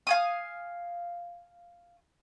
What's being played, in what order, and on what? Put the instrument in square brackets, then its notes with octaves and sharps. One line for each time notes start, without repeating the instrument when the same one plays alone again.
[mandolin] F5 G#5 D#6